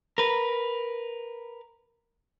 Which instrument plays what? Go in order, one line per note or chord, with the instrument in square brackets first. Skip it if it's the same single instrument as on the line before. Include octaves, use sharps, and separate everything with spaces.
[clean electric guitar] A#4 B4